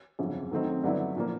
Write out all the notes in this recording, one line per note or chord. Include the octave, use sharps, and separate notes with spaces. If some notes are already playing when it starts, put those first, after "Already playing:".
G1 F2 C#3 F#3
D#3 F#3 A3 C4 D#4
G2 D3 F#3 B3 E4
A#2 F3 A#3